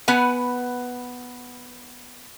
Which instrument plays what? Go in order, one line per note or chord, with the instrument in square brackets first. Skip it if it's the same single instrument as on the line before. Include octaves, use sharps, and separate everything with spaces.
[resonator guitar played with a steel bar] B3 B4 F#5 G#5